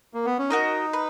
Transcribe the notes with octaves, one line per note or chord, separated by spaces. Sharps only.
A#3
B3
C#4
D#4 F#4 A#4 D#5
B4